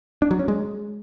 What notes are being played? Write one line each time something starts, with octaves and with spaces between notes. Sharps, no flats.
D4
F#3
C#4
G#3